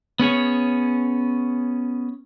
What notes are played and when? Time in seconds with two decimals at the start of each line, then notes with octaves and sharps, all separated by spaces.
0.19 B3 C#4 G#4 C#5